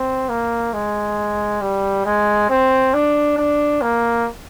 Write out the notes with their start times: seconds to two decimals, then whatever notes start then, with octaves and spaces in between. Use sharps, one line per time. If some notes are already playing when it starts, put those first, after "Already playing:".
Already playing: C4
0.29 A#3
0.74 G#3
1.61 G3
2.05 G#3
2.50 C4
2.94 D4
3.38 D4
3.82 A#3